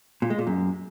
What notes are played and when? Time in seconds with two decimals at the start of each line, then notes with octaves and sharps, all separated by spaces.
0.22 A#2
0.30 G#3
0.38 A#2
0.47 F#2